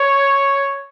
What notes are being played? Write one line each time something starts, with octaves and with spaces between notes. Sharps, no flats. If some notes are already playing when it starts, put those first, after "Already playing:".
Already playing: C#5